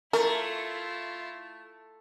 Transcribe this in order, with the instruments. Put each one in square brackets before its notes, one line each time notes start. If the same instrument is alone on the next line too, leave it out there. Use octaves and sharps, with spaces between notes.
[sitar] A3 [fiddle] E4 F4 [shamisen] A#4